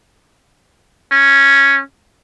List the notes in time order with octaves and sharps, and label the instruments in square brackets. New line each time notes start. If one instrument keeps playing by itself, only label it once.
[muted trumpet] C#4